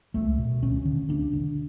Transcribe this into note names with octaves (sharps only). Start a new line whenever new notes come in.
C#2 A3
B2
D2 C#4
D3
D2 D4
D3